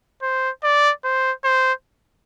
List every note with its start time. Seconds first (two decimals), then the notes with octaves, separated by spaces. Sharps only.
0.22 C5
0.63 D5
1.04 C5
1.44 C5